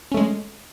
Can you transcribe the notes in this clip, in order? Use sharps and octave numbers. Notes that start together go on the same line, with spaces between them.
G#3 A3 C#4